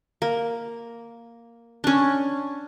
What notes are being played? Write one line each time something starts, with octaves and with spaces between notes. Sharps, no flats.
A#3
C#4 D4